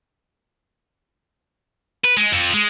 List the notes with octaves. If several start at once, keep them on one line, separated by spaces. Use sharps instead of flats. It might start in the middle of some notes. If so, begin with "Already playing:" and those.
B4
G#3
F2
G#3